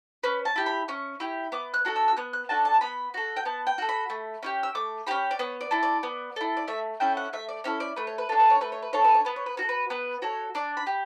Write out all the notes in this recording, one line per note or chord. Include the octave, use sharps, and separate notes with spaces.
C#4 B4
A5
E4 G4
B5
C#4 C#6
E4 G4
B3 D6
F#6
D4 F#4 A4
E6
E6
B3 F#6
F#6
D4 F#4 A4 A5
A5
B3 B5
F#4 A4
G5
B3 A5
G5
F#4 A4
B5
A3
C#4 E4 G4
E6
A3 D6
C#4 E4 G4 B5
D5
B3 C#5
D5
E4 A4
D5
B3
E4 A4
D5
A3 E5
C#4 E4 A4 G5
F#5
A3 E5
D5
C#4 E4 A4 C#5
D5
A3 B4
C#5
B4
D4 A4 C#5
B4
C#5
A3 B4
C#5
B4
D4 A4 C#5
B4
C#5
B3 B4
C#5
B4
F#4 A4 C#5
B4
B3 B4
F#4 A4 C#5
D4 D5
B5
G4